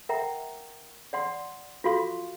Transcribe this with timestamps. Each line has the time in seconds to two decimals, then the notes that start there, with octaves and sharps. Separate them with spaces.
0.09 A#4 E5 F#5 G5 A#5
1.13 D5 F#5 C6
1.84 F4 F#4 A4 F5 C6 C#6